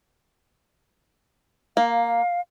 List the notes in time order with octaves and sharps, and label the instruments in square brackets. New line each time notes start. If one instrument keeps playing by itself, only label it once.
[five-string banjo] A#3 [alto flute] F5